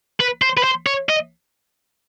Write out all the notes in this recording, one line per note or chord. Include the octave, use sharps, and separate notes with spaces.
B4
C5
B4
C5
C#5
D#5